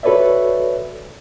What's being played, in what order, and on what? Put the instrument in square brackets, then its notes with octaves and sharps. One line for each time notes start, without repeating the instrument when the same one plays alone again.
[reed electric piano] F#4 A4 B4 C#5 D5 E5